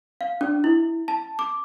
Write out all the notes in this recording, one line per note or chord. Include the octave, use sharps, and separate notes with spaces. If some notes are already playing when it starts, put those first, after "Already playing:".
F5
D4
E4
A5
D6